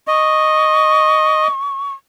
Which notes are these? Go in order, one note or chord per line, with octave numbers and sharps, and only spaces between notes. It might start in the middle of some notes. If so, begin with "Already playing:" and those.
D#5 C#6